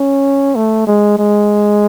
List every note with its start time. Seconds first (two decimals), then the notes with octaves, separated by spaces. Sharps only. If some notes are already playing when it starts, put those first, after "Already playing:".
Already playing: C#4
0.55 A3
0.87 G#3
1.18 G#3